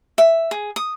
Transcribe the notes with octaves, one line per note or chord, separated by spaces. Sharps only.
E5
G#4
D#6